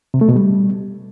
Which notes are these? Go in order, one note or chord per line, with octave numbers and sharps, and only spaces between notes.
C3
A3
B2
G3